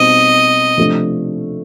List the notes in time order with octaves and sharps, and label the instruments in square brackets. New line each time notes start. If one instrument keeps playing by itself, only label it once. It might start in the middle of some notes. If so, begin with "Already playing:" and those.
Already playing: [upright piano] B2 G3 C4 D#4 [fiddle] D#5
[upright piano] C3 F3 A3 D4